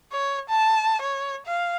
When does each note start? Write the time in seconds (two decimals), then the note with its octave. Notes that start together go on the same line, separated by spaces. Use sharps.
0.12 C#5
0.49 A5
1.01 C#5
1.46 F5